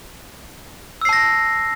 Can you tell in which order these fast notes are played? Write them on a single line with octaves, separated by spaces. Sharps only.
E6 C7 A5 A#6